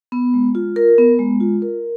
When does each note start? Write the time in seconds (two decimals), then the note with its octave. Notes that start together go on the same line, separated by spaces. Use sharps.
0.12 B3
0.34 G#3
0.55 F4
0.76 A#4
0.98 B3
1.19 G#3
1.40 F4
1.62 A#4